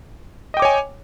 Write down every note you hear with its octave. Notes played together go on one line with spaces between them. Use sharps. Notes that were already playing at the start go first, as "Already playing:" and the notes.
C#5 D#5 G5 G#5 D6